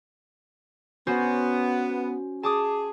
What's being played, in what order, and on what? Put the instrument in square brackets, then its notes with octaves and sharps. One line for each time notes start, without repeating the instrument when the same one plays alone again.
[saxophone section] B3 [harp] C#4 F#4 C5
[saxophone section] G#4 [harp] A5 D6 D#6